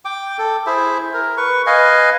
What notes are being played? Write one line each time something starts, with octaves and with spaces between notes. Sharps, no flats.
G5 D6
A4
E4 G#4 C5 E5
A#4
B4 C#6
B4 D#5 F5 G#5